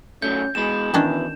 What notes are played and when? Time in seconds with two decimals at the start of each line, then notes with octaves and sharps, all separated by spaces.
0.22 F#2 F#3 A3 C#4 G6
0.55 E2 B2 G#3 B4 E7
0.94 D#3 E3 C#4 D4